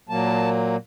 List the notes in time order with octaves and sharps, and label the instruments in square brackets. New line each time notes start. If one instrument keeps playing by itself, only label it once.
[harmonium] A#2 F#3 A#3 A5